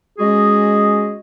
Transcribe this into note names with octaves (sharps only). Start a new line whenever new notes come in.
G#3 C#4 F#4 G#4 D#5